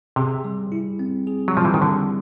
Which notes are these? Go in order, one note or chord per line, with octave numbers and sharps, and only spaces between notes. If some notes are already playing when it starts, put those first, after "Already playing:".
C3 G#4
G3
E4
C4
G#4
F#3
F3 G3
E3
D#3
D3 E4